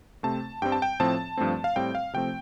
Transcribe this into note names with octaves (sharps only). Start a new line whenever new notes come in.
C3 A3 C4 A5
G2 G3 C4 G5
A5
G5
A2 F3 C4 A5
G2 F3 A3 C4
F5
A2 G3 C4 G5
F5
C3 F3 A3 C4 G5